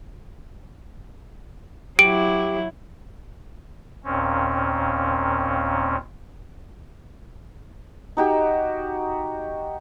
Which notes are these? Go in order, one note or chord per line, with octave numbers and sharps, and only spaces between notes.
F#3 E4 G4 D6 D7
D#2 A#2 C4 C#4
D#4 F#4 G4